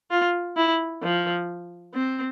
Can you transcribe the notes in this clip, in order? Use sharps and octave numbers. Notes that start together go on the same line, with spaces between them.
F4
E4
F3
C4